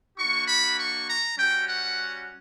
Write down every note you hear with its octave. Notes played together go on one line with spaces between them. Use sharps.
A#3 D4 F#4 C#6
B5
C#6
A#5
G3 C#4 F#4 G5
F#5